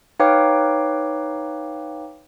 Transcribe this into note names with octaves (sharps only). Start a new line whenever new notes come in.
D#4 B4 C#5 F5 G5 D6